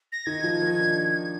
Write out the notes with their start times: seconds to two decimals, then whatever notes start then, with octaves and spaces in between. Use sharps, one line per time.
0.12 A#6
0.26 D#3 D#4 G#6
0.44 F3 F4
0.61 D#3 D#4
0.79 D4